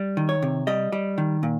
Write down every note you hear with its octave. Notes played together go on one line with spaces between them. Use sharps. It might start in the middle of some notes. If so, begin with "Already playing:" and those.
Already playing: G3
D#3
C#5
C3
G3 D#5
G3
D#3
A#2